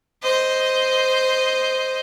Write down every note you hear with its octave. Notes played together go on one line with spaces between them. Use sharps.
C5 D#5